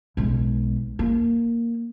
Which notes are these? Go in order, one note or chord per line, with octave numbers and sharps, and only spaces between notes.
B1 G#3
A#3